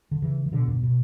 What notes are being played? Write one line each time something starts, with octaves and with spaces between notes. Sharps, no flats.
D3
C#3 E3
E3
B2 D3
G2 B2
B2